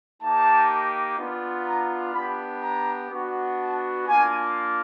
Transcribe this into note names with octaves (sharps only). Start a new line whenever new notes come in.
A#3 D#4 G4 A5
B3 D4 F4
A#5
B3 D4 G4 B5
A#5
B3 D4 F#4
A5
A#3 D4 F4 G#5